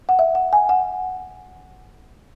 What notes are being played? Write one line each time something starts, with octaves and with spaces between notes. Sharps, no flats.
F#5
E5
F#5
G#5
F#5